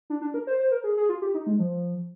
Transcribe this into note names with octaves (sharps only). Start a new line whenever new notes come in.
D4
D4
A#4
C5
C5
A#4
G#4
G#4
F4
G4
D#4
G#3
F3